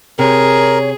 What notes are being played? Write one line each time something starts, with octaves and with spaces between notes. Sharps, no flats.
C3 G#4 A#4 C#5